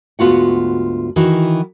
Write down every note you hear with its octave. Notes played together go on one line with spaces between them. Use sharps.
D2 G#2 B3 F4 F#4 F#5
D#3 E3 F#4